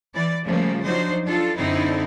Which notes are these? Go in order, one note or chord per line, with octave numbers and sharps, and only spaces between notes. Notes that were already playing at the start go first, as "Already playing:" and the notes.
E3 D5
C#3 F3 G3 A3 A#3
F3 F#3 D4 D#4 C5
D4 F4 A4
F#2 D3 C4 D#4 E4 C5